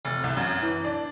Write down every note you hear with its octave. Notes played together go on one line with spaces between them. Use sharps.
F1
C2
F#2
E3
D4